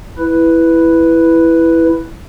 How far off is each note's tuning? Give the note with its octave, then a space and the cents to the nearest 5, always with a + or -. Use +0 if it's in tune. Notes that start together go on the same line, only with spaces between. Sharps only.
E4 +0 B4 +0